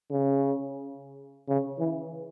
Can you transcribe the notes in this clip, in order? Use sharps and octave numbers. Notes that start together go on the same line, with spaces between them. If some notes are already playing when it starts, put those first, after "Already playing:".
C#3
C#3
E3